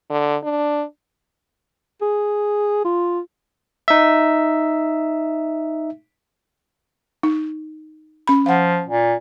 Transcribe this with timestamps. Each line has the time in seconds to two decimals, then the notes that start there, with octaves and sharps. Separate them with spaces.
0.10 D3
0.44 D4
2.01 G#4
2.85 F4
3.88 D#4 E5
7.23 D#4
8.27 C#4 B5
8.46 F3 F5 F#5
8.88 A#2